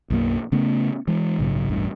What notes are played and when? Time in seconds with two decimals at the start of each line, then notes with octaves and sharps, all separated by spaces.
0.10 B1 F#2 A#3
0.52 C#3 A3 B3 C#4
1.08 E3 G#3
1.39 A#1 G#2 C#3 F#3
1.69 A1 E2 G2